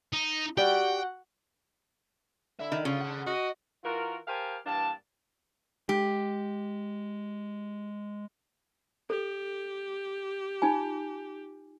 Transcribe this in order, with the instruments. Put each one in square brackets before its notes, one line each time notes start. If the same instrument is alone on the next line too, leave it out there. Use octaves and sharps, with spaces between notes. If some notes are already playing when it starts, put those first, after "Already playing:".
[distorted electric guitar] D#4
[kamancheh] F#4 F#5 [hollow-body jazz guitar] G4 D5 [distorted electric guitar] G5
[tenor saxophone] D3 [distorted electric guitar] E4 E5
[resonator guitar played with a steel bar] D#3
[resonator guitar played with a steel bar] C#3 [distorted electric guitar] F4
[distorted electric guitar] A4 F#5
[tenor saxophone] F#4 [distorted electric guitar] D#5
[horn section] E3 F4 F#4 A#4
G4 A#4 C5 F5 G#5 A5
G2 E3 A#3 D4 A5
[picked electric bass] G#3 [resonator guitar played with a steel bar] G4
[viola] G4 [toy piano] A4
[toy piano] D#4 F4 G#5